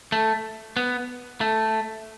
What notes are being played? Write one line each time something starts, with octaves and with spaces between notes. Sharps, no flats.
A3
B3
A3